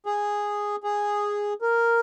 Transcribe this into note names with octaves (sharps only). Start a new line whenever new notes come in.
G#4
G#4
A#4